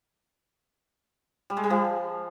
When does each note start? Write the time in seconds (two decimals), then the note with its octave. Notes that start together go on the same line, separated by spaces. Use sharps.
1.50 G3
1.57 G#3
1.63 G3
1.70 F3